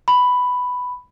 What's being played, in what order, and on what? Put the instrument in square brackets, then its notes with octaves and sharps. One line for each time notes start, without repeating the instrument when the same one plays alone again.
[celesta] B5